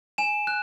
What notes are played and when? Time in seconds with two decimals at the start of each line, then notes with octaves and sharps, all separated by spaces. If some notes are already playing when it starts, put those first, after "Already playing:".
0.18 G#5 E7
0.47 F#6